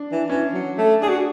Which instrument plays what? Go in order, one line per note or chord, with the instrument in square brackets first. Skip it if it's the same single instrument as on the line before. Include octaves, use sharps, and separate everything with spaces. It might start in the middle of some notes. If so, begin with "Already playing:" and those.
Already playing: [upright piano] D4
[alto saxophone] E3
[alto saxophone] E3 [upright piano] C#4
[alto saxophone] F#3
A3
[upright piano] D4 [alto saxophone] G#4
[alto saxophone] F#4